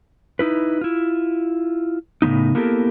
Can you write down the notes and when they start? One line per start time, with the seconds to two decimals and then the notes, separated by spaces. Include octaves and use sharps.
0.39 D#4 E4 B4
0.81 E4 F4
2.22 A2 C#3 F3 B3 D#4
2.55 A#3 B3 E4 G4 A4 A#4